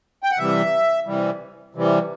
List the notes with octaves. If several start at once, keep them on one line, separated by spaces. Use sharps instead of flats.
G5
F#5
C3 E3 G3 E5
C3 E3 G3
C3 E3 G3